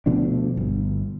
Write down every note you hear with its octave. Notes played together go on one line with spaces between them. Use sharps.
D2 B2 F3 D4
G1